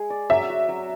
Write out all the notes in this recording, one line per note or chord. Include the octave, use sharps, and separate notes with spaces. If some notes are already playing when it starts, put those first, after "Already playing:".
Already playing: G#3 G#4
D5
F#3 E5
F#4
F#3